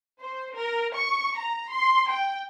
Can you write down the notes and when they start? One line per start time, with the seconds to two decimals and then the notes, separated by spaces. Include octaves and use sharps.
0.21 C5
0.55 A#4
0.95 C#6
1.37 A#5
1.71 C6
2.10 G5